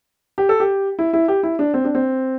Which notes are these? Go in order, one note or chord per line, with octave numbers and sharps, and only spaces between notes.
G4
A4
G4
E4
E4
G4
E4
D4
C4
D4
C4